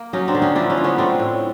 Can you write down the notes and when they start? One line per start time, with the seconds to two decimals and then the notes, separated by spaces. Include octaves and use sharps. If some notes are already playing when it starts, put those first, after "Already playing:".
Already playing: A#3
0.13 F#3 C#4 D#4
0.28 C4 D4
0.35 D3
0.42 C#4 D#4
0.56 F3 D4 E4
0.70 C#4 D#4
0.77 F3
0.84 B3 C#4
0.98 A3 C4 D4
1.19 A2